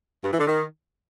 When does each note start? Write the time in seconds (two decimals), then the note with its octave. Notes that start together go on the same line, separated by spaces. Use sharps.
0.24 G2
0.32 E3
0.39 D3
0.47 D#3